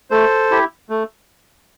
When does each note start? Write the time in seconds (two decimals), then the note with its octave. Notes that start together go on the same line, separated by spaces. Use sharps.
0.10 A3 A4 C5
0.51 E4 G4
0.90 A3